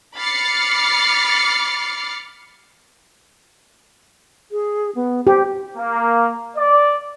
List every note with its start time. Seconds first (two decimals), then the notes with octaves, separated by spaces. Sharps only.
0.16 B5 D6 F6 A6 C7 C#7
4.52 G#4
4.95 B3
5.27 G4 C5
5.77 A#3
6.57 D5